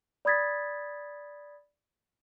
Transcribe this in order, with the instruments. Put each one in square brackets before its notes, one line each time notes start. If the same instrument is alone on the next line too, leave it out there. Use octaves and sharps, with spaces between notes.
[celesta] D5 B5 D#6 G#6 A6 B6